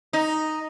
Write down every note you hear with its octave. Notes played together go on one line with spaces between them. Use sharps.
D#4